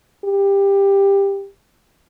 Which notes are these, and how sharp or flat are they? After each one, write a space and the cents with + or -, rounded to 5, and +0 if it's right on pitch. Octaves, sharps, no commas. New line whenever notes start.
G4 +15